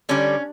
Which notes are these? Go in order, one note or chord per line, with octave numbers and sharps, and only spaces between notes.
D3 G3 C#4